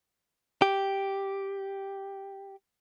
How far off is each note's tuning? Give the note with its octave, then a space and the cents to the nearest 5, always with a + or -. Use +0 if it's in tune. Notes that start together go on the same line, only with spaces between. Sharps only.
G4 +0